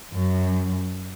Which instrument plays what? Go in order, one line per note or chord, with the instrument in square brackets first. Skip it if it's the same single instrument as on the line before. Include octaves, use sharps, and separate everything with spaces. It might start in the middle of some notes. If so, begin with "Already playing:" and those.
[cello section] F#2